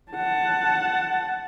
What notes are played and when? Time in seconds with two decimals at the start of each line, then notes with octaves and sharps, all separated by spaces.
0.12 F#5 A5